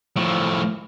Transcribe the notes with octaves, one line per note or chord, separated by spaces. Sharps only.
A2 F3